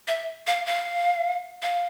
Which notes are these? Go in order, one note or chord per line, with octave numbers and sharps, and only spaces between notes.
E5
F5
F5
F5